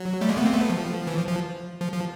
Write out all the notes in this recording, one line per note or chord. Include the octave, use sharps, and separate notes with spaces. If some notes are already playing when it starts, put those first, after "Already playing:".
Already playing: F#3
G3 A3
G#3 A#3
A3 B3
A#3 C4
A3 B3
F3
E3
F3
F3
F3
F3